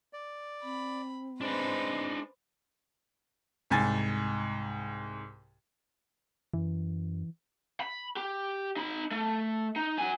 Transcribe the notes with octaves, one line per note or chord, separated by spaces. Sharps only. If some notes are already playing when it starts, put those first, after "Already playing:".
D5
C4 B5
G#3 D4 D#4 B4 C5
C2 G#2 G#5 A6
F#2 E3
B5
G4
D#4 B5
A3
D#4
F#4 G#5